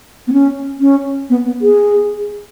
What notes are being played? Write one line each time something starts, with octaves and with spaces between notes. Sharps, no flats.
B3
C#4
C#4
B3
B3
G#4